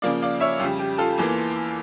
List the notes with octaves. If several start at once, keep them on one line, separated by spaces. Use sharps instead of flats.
C#3 F3 A#3 D5 F5
D5 F5
C#5 E5
F2 C#3 G3 F4
G4
F4 A4
E2 E3 A#3